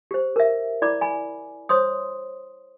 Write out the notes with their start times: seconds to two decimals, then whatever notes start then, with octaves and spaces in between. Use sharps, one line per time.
0.11 G4 C5
0.36 A#4 E5
0.82 E4 D5 B5 D6
1.01 G#5 B5
1.69 C5 C#5 C6 D#6